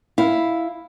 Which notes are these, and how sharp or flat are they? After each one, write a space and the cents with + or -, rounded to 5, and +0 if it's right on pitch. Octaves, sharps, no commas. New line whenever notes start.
E4 +0 F5 +0